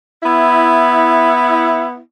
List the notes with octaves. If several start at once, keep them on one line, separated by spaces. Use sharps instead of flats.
B3 E4